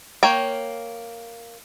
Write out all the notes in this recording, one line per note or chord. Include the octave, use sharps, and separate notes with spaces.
A#3 C#5 G5